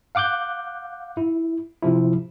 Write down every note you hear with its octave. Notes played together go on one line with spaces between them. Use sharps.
F5 F#5 D6 F#6 G6
E4
C3 F3 E4